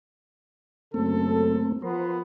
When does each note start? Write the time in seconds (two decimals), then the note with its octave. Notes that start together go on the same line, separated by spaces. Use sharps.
0.94 F#2 C#3 A3 A#3 C4 A4
1.82 F3 B3 A#4 C5